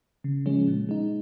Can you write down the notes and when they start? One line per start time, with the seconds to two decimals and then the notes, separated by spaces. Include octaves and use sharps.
0.24 C#3
0.46 F3 G#3 C#4
0.68 A#2
0.89 G#3 D#4